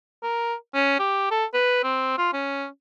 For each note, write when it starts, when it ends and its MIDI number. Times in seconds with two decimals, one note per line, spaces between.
0.23 0.54 70
0.74 0.97 61
0.99 1.30 67
1.31 1.45 69
1.54 1.82 71
1.83 2.16 60
2.18 2.32 65
2.33 2.66 61